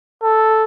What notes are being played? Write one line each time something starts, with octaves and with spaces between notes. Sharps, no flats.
A4